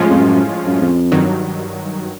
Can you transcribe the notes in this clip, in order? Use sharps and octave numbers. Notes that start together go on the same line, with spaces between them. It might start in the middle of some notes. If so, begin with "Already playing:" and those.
Already playing: A2 F3 G#3 C#4 F4
F2
F#2
F#2
F2
G2 D#3 F#3